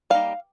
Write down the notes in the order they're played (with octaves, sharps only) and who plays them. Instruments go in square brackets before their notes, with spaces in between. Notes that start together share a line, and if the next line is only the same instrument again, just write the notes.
[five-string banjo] G3 A#3 D#4 F5